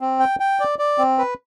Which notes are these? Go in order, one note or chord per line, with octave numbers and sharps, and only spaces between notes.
C4
G5
G5
D5
D5
C4
B4